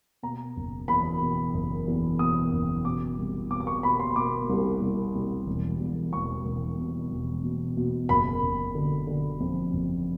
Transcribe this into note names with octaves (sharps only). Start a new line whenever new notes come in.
B2 A#5
F#1
E2 B5
B2
F#1
E2
B2 D#6
F#1
B2 D6
C2
B2 D6
D6
C#6
B2 B5
C6
B2 D6
C2
C2
C2
E1
E2
E1 C#6
E1
B2
E1
B2
B2
F#1 B5
F#1
D3
D3
F2
F#1